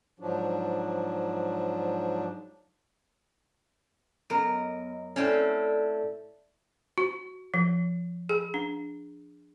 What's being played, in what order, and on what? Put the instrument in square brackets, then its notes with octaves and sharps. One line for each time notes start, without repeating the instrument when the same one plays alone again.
[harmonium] G#2 F3 F#3 D4
[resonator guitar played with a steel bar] F#2 A#4 [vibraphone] B3 D#5
[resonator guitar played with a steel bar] A2 C4 C#4 [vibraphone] A4 D5 E5
[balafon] F#4
F3
G#4
D4